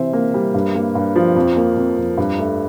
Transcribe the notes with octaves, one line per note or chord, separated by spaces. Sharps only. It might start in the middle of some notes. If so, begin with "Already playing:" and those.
Already playing: C3 E3 C5 E5
A#3
G3
G2
A#3
G2
F3
F2
A#3
F2
F2
G2
A3